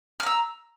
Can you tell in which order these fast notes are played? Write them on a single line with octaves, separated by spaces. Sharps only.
F6 A#5 E6